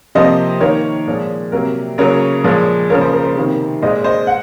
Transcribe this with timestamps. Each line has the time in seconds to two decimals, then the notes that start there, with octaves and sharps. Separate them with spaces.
0.15 C3 F3 A#3 C5 D#5
0.60 D#3 A#3 A#4 C#5
1.07 A#2 F3 G#3
1.52 C3 F#3 A#3 A#4
1.98 C#3 F#3 A#3 A#4 C#5
2.44 A#2 F3 G#3
2.90 A#3 A#4 C#5
2.93 C#3 F3
3.01 C5
3.13 A#4
3.24 C5
3.36 C3 D#3 A#3
3.82 A#2 G#3 C5 D#5
4.04 C5 D#5
4.27 F#5